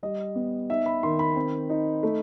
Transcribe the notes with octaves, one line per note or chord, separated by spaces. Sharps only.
G3 D#5
B3
D#4 E5
B5
D#3 C6
B5
C4
D#4
A3